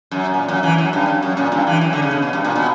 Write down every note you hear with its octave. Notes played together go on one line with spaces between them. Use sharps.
F#2
A#2
F#2
E3
F#2
G2
F#2
F#2
A#2
G2
E3
F#2
D3
C#3
B2
B2
G2
A#2
B2